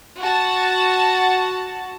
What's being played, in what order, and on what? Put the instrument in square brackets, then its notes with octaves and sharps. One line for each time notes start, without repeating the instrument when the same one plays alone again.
[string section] F#4 A5